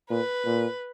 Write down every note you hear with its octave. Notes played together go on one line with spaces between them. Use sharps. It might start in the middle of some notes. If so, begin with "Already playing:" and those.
A#2 B4
A#2